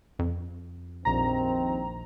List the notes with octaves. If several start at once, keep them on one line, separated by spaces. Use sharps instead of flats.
F2
A#1 D#2 D#3 C4 A#5